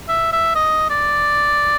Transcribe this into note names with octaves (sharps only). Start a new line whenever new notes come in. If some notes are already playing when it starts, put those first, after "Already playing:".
E5
E5
D#5
D5